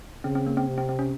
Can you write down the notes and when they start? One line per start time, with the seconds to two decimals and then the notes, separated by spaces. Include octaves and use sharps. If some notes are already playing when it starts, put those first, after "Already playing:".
0.24 C#3 C4
0.35 C4
0.46 A#3
0.57 C4
0.68 C3
0.78 C4
0.89 C4
0.99 C#4